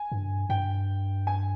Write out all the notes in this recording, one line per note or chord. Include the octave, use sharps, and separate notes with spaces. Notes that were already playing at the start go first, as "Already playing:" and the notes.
Already playing: G#5
G2
G2 G5
G#5